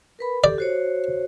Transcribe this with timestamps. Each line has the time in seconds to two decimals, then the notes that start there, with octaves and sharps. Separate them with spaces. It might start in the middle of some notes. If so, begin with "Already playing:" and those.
0.19 A#4 B4 B5
0.44 G4 A4 D5
0.58 F#4 C5 C#5